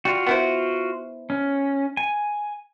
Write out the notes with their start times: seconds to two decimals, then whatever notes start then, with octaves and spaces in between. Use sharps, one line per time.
0.05 G3 F4 F#4
0.26 B3 E4 C5
1.30 C#4
1.97 G#5